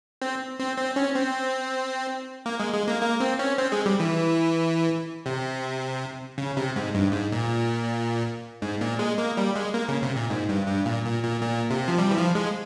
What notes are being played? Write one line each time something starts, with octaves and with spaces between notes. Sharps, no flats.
C4
C4
C4
C#4
C4
A#3
G#3
G#3
A#3
A#3
C4
C#4
C4
G#3
G3
E3
C3
C#3
C3
G#2
G2
G#2
A#2
G#2
A#2
G#3
A#3
G3
G#3
A#3
C#3
C3
A#2
G#2
G2
G2
A#2
A#2
A#2
A#2
C3
F3
G3
E3
F3
G#3